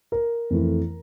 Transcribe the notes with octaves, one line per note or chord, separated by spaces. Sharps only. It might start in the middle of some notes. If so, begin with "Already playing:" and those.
A#4
F2 E3 A3 E4